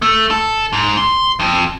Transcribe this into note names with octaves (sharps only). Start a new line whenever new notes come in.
A3
A4
G#2
C6
F2